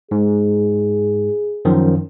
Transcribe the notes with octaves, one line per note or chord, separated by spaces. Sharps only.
G#2 G#4
F#2 D#3 F3